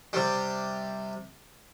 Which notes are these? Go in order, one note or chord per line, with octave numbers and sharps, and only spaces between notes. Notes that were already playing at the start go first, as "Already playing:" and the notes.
C3 G3